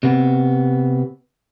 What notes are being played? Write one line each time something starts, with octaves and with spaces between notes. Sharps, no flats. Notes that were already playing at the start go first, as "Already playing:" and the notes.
C3 B3